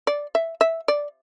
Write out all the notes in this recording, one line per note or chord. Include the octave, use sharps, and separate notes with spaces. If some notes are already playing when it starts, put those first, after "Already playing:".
D5
E5
E5
D5